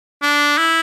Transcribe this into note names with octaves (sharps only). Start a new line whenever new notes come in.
D4
E4